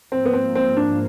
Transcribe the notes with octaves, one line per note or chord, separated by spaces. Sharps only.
G#2 F3 A#3 C4
B3
C4
C4
D4